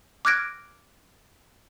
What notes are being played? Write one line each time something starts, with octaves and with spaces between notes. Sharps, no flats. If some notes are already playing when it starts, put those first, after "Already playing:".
D6 F6 F#6 G#6 A#6 D7